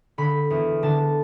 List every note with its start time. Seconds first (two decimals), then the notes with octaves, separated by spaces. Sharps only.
0.18 D3 B5
0.50 E2
0.82 D3 A5